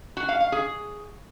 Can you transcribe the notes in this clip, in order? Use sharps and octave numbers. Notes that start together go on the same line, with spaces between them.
F#4
F5
F5
G#4